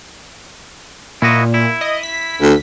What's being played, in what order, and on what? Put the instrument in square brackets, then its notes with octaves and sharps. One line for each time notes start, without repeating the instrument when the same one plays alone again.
[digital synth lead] A#2 [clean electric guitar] E4 F#4 D#5
[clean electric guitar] E4
[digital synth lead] D#5
B6
[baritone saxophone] D2